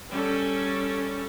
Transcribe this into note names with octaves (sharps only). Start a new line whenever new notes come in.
G3 C#4 A4